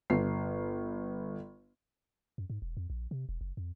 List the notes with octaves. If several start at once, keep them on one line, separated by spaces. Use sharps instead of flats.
G1 C7
F#2
G#2
E1
F2
A#1
C3
E1
F#1
F2